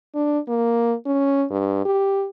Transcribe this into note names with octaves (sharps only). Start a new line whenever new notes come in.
D4
A#3
C#4
G2
G4